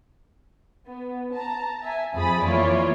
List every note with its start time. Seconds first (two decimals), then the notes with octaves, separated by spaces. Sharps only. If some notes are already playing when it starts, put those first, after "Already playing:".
0.85 B3
1.33 A5 A#5
1.82 E5 G#5
2.14 F2 G#4 B5 D#6 A6
2.44 E3 A#3 E4 F4 C#5 D5